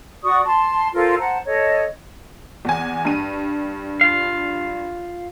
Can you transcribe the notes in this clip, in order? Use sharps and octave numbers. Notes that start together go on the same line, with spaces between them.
F#4 D5 C#6 D#6
A5 C6
F4 A4 A#4 C5
C5 F#5 A5 A#5
A4 C#5 D#5
E2 G#5
G2 D#7
F4 F5